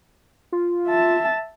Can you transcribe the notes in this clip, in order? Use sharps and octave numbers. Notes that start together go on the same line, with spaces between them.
F4
E5 A5